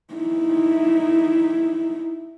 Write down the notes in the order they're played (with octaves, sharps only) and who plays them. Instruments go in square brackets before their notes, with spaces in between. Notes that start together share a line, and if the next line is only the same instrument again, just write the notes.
[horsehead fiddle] D#4 E4